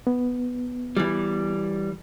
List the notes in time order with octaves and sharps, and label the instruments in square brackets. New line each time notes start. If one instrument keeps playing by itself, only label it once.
[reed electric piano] B3
[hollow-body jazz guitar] E3 G3